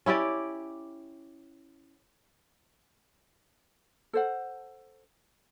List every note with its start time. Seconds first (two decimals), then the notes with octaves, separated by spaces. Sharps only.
0.06 C#4 E4 G4 D5
4.13 A4 C5 F#5